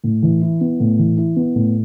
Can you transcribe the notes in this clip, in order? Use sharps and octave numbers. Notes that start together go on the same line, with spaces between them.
A2
E3
E4
B3
A2
E3
E4
B3
A2